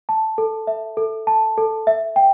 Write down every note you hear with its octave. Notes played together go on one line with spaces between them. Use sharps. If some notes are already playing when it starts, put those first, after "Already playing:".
A5
A4
E5
A4
A5
A4
E5
G5